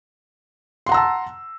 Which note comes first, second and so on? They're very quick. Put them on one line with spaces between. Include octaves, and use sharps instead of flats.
C6 F#5 A#5 E6 A5